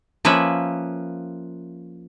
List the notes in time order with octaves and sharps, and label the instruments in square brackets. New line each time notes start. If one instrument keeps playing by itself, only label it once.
[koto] F3 A#3 C#4 B4 E5